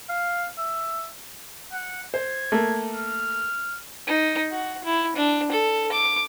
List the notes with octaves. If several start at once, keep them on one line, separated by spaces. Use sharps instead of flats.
F5
E5
F#5
C5 G#6
A3 A#3
F6
D#4
F#4
E4
D4
A4
D6